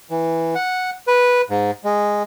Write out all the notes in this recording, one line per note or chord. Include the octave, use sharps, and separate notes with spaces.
E3
F#5
B4
G#2
G#3